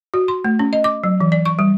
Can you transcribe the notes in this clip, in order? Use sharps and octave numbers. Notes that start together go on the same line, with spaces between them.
F#4
C6
A3
C#4
D#5
D6
F#3
E3
D5
C#6
G3